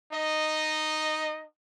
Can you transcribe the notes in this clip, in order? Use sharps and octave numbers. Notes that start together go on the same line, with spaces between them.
D#4 D#5